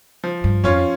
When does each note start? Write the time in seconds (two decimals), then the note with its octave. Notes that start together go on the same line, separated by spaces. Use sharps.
0.24 F3
0.44 G2
0.64 F2 C#4 F4 C#5